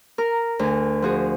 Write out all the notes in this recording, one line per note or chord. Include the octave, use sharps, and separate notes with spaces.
A#4
D2 G#5
F3 F#4 G#4